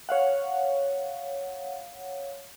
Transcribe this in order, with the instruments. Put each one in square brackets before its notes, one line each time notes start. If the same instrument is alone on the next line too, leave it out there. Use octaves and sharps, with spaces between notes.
[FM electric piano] C#5 F5 F#5